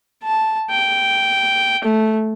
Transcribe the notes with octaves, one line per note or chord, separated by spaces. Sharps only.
A5
G5
A3